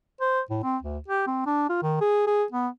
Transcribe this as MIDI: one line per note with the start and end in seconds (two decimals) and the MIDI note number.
0.21 0.41 72
0.50 0.59 45
0.64 0.77 60
0.82 0.98 38
1.08 1.23 67
1.27 1.46 60
1.46 1.68 62
1.70 1.80 65
1.82 2.01 51
2.01 2.25 68
2.27 2.44 68
2.52 2.68 59